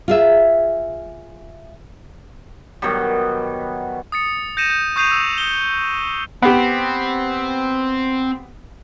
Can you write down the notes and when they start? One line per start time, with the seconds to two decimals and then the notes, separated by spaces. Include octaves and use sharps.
0.08 F4 G#4 E5
2.82 B2 D#3 F#3 G3
4.12 D#6 A6 C#7
4.57 G6 A#6 C#7 D#7 E7
4.70 G6
4.96 C#6 D#6 G6 C7 D#7 F7
5.11 E6
5.38 D#6 C#7 G7
6.42 B3 C4 G4